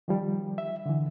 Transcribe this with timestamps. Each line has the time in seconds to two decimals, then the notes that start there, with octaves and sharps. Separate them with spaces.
0.08 D#3 F3 G3
0.58 E5
0.86 D3 E3